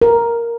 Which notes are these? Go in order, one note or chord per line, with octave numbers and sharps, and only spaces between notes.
A#4